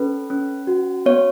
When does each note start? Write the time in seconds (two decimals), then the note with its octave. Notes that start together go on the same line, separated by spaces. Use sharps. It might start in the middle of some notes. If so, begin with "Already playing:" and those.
Already playing: C#4 A4 B4
0.30 C#4
0.67 F#4
1.06 B3 C#5